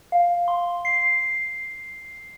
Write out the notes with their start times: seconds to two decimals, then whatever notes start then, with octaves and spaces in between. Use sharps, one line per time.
0.12 F5
0.48 C6
0.85 C7